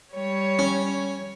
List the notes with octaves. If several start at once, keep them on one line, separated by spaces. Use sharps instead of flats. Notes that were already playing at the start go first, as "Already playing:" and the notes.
G3 C#5
C#4